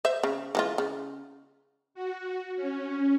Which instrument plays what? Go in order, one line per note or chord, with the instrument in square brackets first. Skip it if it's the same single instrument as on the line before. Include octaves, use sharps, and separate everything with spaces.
[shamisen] C5 E5
C#3
E3 G#3 F4
C#3
[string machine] F#4
C#4